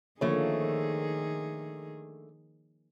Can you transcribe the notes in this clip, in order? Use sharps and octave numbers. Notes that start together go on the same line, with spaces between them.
D3 D#3 F3 A3 A#3 G#4 C#5